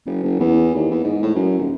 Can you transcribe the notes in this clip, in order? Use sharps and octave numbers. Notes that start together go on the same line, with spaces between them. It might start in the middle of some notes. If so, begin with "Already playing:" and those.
F#1
F#1
E2
D#2
E2
G#2
A2
F#2
D#1